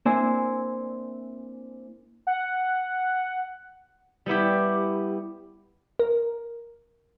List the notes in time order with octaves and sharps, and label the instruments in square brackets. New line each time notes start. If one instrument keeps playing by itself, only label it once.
[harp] A#3 C4 D4 E4 C5 G#5
[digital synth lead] F#5
[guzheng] G3 B3 E4 G4
[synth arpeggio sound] A#4